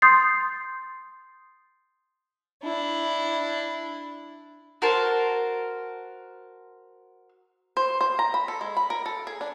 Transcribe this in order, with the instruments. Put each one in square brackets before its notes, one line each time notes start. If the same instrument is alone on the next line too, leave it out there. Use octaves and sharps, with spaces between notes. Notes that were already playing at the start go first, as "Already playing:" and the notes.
[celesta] C6 D#6 G6 A6 C7
[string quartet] D4 E4
[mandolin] F#4 A#4 C5 A5
[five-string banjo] C5
C5
A#5
B5
A4
G#3
B5
A#4
A4
G#4
D4